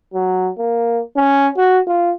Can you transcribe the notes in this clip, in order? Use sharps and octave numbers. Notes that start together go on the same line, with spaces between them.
F#3
A#3
C#4
F#4
F4